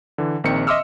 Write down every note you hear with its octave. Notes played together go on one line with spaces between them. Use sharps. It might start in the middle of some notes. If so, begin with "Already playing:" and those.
D3 E3
A#1 D#3 C4 C#7
D#5 E5 C6 D6 E6 F6